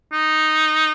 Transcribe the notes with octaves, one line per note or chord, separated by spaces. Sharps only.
D#4